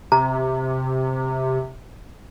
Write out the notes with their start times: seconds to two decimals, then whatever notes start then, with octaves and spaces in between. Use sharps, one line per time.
0.12 C3 A#5